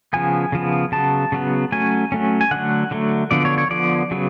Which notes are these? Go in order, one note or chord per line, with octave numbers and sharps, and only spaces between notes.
C#3 F3 B3 G#5
C#3 F3 B3
C#3 F#3 B3 A5
C#3 F#3 B3
F#3 A3 C#4 G#5
F#3 A3 C#4
G#5
D3 F#3 A3 F#5
D3 F#3 A3
D3 F3 B3 D5
C#5
C#5
D3 F3 B3 D5
C#3 F#3 B3